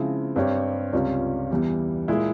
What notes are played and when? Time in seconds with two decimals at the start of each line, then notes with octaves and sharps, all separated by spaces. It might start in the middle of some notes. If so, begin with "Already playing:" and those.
Already playing: C#3 F3 G#3 C4 E4
0.35 G2 G3 C4 G4 C#5
0.93 C#2 C3 G3 C#4 F4
1.51 E2 E3 G3
2.08 A#2 G#3 E4 G#4